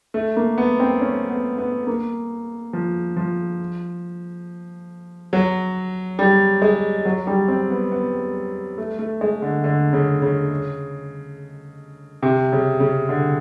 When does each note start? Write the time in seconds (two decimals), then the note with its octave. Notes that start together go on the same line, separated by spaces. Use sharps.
0.14 A3
0.37 A#3
0.58 B3
0.80 C4
1.01 C#4
1.30 B3
1.58 B3
1.87 A#3
2.73 F3
3.17 F3
5.33 F#3
6.19 G3
6.62 G#3
7.05 F#3
7.27 G3
7.48 C4
7.70 B3
7.92 B3
8.78 A3
8.99 A3
9.21 G#3
9.42 D3
9.64 D3
9.93 C#3
10.22 C#3
12.22 C3
12.52 C#3
12.80 C#3
13.09 D3